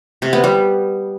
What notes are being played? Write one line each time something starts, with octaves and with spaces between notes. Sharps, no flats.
C3
B3
G3